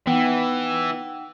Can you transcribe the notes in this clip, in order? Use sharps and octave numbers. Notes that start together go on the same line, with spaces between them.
E3 B3 D#4 F#5 G5